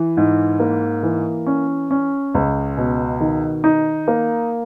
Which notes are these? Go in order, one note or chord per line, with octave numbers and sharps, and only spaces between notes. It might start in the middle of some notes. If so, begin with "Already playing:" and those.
Already playing: E3
G#2
A#3
E3
C#4
C#4
C#2
B2
D#3
D#4
A#3